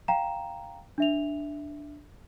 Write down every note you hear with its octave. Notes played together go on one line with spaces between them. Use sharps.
F5 G5 A#5 E7
D4 E5 F7